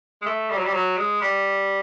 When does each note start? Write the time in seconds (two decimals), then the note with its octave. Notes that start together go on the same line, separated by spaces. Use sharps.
0.22 G#3
0.26 A3
0.50 G3
0.57 F#3
0.65 G3
0.74 F#3
0.98 G#3
1.21 G3